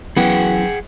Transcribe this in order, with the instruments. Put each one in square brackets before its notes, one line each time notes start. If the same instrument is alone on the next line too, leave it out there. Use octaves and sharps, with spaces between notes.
[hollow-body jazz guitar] F#2 E3 B3 [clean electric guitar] G#4 F#5 G5